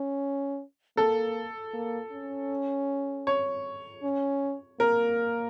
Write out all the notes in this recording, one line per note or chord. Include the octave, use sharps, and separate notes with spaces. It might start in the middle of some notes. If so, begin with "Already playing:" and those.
Already playing: C#4
A#3 A4
A#3
C#4
C#5
C#4
A#3 A#4